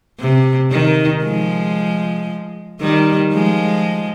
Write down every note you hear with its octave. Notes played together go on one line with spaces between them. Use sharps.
C3
D#3
F3 G#3
D#3 G3
F3 G#3